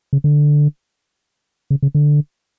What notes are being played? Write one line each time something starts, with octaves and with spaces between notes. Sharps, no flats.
C#3
D3
C#3
C#3
D3